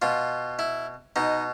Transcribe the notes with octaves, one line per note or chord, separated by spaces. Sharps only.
B2 F4
E4
B2 D#4